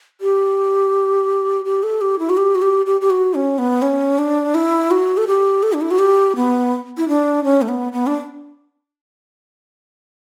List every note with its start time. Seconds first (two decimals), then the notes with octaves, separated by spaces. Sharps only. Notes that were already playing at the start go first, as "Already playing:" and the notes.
0.21 G4
1.65 G4
1.83 A4
2.01 G4
2.19 E4
2.30 F#4
2.37 G4
2.55 F#4
2.62 G4
2.86 G4
3.01 G4
3.10 F#4
3.34 C#4
3.58 B3
3.82 C#4
4.19 D4
4.55 E4
4.91 F#4
5.17 A4
5.28 G4
5.63 A4
5.73 D4
5.81 E4
5.91 F#4
5.99 G4
6.36 B3
6.97 E4
7.08 D4
7.44 C#4
7.62 A3
7.68 B3
7.93 B3
8.07 D4